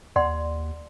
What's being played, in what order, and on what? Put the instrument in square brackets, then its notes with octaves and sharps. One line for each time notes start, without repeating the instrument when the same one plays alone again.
[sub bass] D#2 [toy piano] D5 F#5 C6